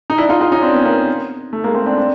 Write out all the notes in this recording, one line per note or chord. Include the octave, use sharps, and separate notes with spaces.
D#4
D4 E4
D#4 F4
D#4 F4
C#4 D#4
C4 D4
B3 C#4
A#3 C4
A3
G#3 A#3
A#3 C4
C4 D4
C4 D4